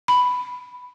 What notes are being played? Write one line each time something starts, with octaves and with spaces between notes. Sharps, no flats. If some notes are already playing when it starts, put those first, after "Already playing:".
B5